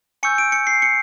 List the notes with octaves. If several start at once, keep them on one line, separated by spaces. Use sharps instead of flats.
G#5 C#6 E6 G6 C#7
D7
C#7
C7
C#7